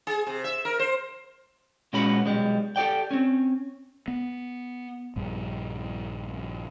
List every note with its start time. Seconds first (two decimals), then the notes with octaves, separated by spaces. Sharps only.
0.07 G#4
0.27 C3
0.44 E5
0.65 A#4
0.79 C5
1.93 A#2 G#3 B3 C#4 F#4 B5
2.26 B1 E2 G3 G#3
2.76 G4 A4 D5 G5
3.11 C4 C#4
4.08 B3
5.16 A#1 G2